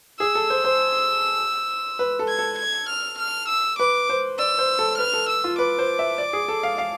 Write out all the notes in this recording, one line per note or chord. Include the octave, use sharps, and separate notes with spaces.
G#4 E6
A4
C5
C5
B4
A4
G#6
A4
G#6
F6
F6
E6
B4 D6
C5
D5 E6
C5
A4
B4 F6
A4
E6
F4
B4 D6
C5
E5
D5
G#4
A4
F5
F5